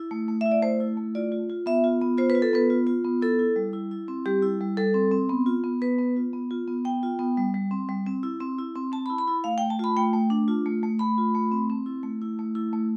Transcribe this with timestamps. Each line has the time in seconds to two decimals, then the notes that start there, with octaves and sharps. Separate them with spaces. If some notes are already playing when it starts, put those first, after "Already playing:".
Already playing: E4
0.11 A3
0.28 A3
0.41 E4 E5
0.52 D5
0.62 A3 C5
0.80 E4
0.97 A3
1.15 F4 D5
1.32 F4
1.50 F4
1.66 B3 E5
1.84 F4
2.01 B3
2.18 F4 C5
2.30 B4
2.35 F4
2.42 A4
2.53 B3 B4
2.70 F4
2.87 F4
3.04 B3
3.21 E4 A4
3.39 E4
3.56 G3
3.73 E4
3.91 E4
4.08 C4
4.26 G3 G4
4.42 E4
4.61 G3
4.77 G3 A4
4.94 C4
5.11 C4
5.29 B3
5.46 F4
5.64 B3
5.82 B3 B4
5.98 B3
6.16 F4
6.33 B3
6.51 F4
6.68 B3
6.85 B3 G5
7.03 F4
7.19 B3
7.37 G3
7.54 G3
7.71 C4
7.89 G3
8.06 C4
8.23 E4
8.40 C4
8.58 E4
8.75 C4
8.92 C4 A5
9.06 B5
9.10 E4
9.18 B5
9.28 E4
9.44 A3 F5
9.58 G5
9.61 A3
9.70 A5
9.79 F4 B5
9.97 A3 G5
10.13 A3
10.30 D4
10.48 F4
10.66 A3
10.83 A3
10.99 A3 B5
11.18 F4
11.35 A3
11.52 C4
11.70 C4
11.86 E4
12.03 A3
12.22 E4
12.39 A3
12.55 E4
12.73 A3